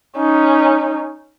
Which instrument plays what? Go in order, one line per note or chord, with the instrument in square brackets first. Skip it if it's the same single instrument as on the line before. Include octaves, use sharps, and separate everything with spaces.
[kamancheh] C#4 D#4